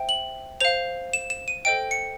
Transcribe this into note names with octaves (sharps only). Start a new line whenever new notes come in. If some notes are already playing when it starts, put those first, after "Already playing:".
Already playing: C5 E5 G5
F#7
C5 F5 F7
E7
E7
D#7
A4 C5 D#5 G5 D7
C#7